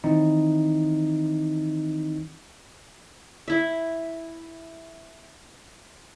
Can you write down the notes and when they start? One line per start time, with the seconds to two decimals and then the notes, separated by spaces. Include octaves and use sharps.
0.04 D#3 E3 C4 D#4 E4
3.48 E4 E5